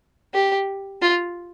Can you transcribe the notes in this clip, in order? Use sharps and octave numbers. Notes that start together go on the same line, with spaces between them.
G4
F4